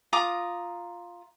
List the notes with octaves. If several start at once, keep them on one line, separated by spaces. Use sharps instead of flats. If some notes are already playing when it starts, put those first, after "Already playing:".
F4 A#5 D6 D#6